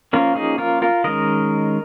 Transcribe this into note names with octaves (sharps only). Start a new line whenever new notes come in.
F3 A#3 C#4 F4 A#4
D#4 G#4
F4 A#4
F4 A#4
D#3 G#3 C#4 A#4 D#5